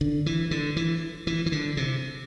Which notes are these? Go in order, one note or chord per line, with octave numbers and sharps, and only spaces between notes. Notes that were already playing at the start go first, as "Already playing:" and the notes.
D3
E3
D3
E3
E3
E3
D3
C3